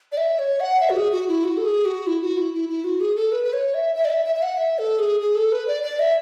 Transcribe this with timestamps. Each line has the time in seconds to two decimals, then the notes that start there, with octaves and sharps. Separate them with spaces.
0.12 D5
0.17 E5
0.39 C#5
0.60 F#5
0.81 E5
0.90 F#4
0.96 G#4
1.12 F#4
1.28 E4
1.44 F#4
1.57 A4
1.64 G#4
1.85 F#4
2.07 E4
2.22 F#4
2.37 E4
2.54 E4
2.69 E4
2.84 F#4
3.00 G#4
3.16 A4
3.32 B4
3.44 B4
3.53 C#5
3.74 E5
3.95 E5
4.05 D5
4.10 E5
4.26 E5
4.36 E5
4.42 F#5
4.57 E5
4.79 A4
4.99 G#4
5.21 G#4
5.35 A4
5.52 B4
5.68 D5
5.83 D5
5.99 E5